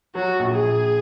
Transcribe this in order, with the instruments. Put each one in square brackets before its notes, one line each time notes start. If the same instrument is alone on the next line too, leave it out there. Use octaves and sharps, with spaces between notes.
[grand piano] F#3 [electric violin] F#4
[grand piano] A#1
[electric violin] G#4
[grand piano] A#1